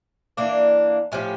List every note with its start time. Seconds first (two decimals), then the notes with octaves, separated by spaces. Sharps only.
0.37 E3 A#3 D4
1.12 A2 F3 C#4 G4